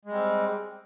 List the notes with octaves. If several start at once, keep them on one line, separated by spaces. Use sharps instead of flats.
G3 G#3 C4